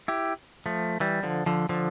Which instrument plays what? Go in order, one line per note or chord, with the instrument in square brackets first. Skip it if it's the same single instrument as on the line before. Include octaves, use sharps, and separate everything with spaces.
[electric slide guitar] E4 G4
F3 A3
E3 G3
D3 F3
D3 F3
D3 F3